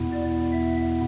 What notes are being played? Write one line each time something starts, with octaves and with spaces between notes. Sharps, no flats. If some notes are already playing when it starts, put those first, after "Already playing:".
Already playing: E2 B2 B3 E4
D5
E5